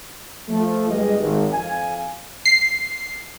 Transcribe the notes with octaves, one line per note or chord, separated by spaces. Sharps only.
F3 A3
G1 G3 G#3 G#4 B4 D#5
G#1
F2 F3 F5 G#5
C7